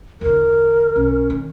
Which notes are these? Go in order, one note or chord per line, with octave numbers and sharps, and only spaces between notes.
E2 D3 A#4
B1 C#4
D#3